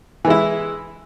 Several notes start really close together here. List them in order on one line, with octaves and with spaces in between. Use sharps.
E3 G#3 E4